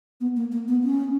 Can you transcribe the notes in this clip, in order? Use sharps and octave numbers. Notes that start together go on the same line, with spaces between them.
B3
A#3
A#3
B3
C#4